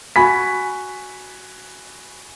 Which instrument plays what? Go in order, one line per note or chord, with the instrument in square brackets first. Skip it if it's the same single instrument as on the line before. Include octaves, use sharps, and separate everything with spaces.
[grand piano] F#4 G#5 B5 B6